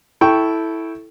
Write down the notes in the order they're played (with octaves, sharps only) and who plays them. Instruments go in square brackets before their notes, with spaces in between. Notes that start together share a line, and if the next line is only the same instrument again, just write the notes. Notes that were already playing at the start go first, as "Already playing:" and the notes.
[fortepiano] E4 A4 G5 C#6